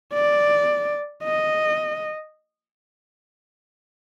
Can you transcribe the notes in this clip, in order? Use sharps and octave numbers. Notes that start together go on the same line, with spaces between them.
D5
D#5